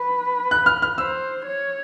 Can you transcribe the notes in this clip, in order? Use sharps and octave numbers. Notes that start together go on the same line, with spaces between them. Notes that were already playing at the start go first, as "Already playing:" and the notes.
Already playing: B4
F#6
F6
F6
C5 E6
C#5